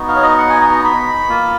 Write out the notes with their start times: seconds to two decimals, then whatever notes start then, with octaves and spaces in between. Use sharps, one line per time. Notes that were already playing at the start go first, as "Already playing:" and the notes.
Already playing: B3 D#4 F#4
0.08 F5
0.15 C#5
0.22 D#5
0.38 F#5
0.50 G#5
0.61 A#5
0.72 A#5
0.84 B5
1.29 A#3 F4